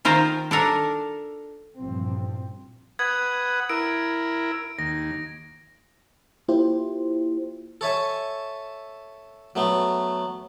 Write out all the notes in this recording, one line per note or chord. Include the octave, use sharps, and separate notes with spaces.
D#3 F4 A#4 C5
D4 A4 A#4
A1 G2 A#2 F3 C4
B4 F#5 D#6 G#6
E4 A#4 D7
D#2 A#6
A#3 E4 F4 G4 C5
A4 C#5 E5 G#5
F#3 A3 B3